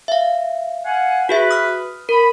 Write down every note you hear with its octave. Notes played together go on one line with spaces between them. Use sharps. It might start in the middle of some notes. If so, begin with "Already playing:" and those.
E5 F5
F5 F#5 G#5
F#4 G#4 B4 E5
D#6 F6
A#4 B5